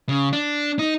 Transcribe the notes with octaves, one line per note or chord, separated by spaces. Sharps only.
C#3
D4
D#4